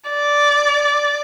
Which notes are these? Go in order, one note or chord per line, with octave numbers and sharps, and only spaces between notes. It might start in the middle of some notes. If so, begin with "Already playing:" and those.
D5